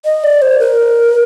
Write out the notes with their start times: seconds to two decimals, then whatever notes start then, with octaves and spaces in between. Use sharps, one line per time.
0.05 D#5
0.24 D5
0.42 C5
0.59 A#4